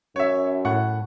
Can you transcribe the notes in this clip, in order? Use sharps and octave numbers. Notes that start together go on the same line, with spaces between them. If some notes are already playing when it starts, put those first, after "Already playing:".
F#2 C#5 E5
A2 F#5 C#6